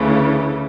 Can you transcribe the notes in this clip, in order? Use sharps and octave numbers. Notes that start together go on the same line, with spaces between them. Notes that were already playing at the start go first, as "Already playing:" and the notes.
Already playing: D2 C#3 E3 A3